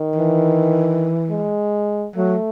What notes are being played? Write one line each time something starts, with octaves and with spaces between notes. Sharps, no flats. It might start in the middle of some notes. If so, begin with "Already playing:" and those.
Already playing: D#3
E3
G#3
F#3 A3